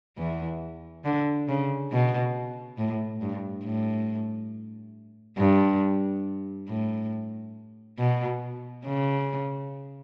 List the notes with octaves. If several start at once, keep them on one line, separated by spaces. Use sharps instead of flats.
E2 E3
D3
C#3
B2
A2
G2
A2
G2
A2
B2
C#3